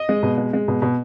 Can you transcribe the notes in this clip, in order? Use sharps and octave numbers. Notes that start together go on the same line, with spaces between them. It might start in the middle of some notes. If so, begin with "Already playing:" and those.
Already playing: D#5
G#3
B2
G#3
G#3
B2
B2